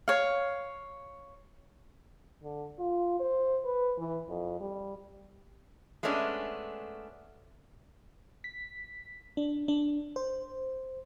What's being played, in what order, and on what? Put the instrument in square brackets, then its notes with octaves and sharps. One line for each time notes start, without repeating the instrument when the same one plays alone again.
[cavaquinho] C#5 F5
[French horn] D3
F4
C5
B4
E3
F2
G3
[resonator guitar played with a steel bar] G#3 A3 B3 C#4 D4
[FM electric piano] B6
D4
D4
C5